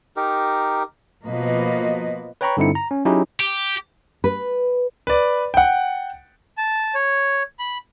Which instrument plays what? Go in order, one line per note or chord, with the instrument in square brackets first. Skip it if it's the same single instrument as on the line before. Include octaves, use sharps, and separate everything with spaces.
[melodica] D#4 G4 A#4
[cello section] B2 F3 A#3 B4 D#5
[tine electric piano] B4 C#5 G5 A#5 B5 C#6
G2 D3 C4 D#4 E4 C#7
A#5
C#4
F#3 C#4 D#4 E4 G4 G#4
[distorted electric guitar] G4
[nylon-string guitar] B4
[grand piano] B4 D5
F#5 G5
[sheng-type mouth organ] A5
C#5
B5